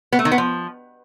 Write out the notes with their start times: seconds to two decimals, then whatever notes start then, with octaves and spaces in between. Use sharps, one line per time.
0.12 B3
0.19 A3
0.25 D#3
0.32 B3
0.38 F3